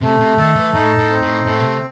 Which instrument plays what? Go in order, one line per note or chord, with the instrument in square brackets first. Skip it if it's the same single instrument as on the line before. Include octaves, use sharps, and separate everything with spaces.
[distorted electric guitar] C3 [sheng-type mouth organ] A3
[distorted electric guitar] C3
[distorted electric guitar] D#3 [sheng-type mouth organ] A4
[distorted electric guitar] E3
[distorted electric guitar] A2 [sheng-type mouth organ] D#4
[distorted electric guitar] A2
[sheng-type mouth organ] C4
[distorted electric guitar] A2
[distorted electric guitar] A2 [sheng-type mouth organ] A3
[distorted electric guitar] B2
C3